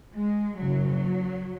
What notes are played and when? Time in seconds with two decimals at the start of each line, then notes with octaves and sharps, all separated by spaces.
0.14 G#3
0.59 F#1 F#2 C#3 F#3